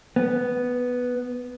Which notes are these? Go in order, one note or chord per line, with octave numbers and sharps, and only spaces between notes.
B3